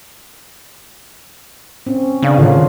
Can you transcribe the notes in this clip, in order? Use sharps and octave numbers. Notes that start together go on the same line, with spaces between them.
C4 C#4
C#3 B3 D4 F5
A2 D3 D#3 F4